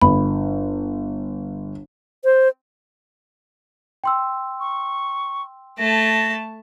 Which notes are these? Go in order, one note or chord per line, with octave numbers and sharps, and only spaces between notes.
G1 B5
C5
G5 C6 E6
C#6
A3 A5 A#6